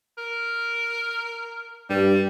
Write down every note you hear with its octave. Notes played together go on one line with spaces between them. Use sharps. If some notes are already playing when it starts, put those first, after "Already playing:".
A#4
G2 G3